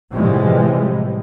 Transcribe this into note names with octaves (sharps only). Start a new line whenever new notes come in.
A2 C3 E3 F3 G3 G#3